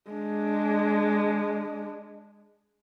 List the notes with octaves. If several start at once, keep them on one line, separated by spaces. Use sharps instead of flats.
G#3 D4